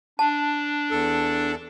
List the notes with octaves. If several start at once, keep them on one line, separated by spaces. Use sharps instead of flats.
D4 A5
E2 A4